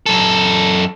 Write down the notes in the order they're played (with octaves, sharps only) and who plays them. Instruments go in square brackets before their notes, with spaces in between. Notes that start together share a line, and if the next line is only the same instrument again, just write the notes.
[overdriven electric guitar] F#2 A4